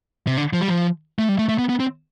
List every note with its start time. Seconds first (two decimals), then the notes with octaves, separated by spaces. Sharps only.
0.27 C3
0.37 D3
0.53 F3
0.61 G3
0.68 F3
1.19 A3
1.29 G3
1.39 A3
1.49 A3
1.59 B3
1.69 B3
1.80 C4